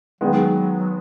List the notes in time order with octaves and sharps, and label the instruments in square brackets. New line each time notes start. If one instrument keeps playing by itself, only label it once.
[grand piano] D#3 G#3 B3 [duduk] F#3